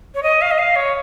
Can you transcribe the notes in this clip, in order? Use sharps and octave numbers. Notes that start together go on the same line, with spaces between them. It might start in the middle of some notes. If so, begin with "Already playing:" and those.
C#5
D#5
F5
D#5
F5
C#5